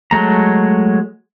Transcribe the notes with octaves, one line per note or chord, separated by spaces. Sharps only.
F#3 G#3 A3 A#5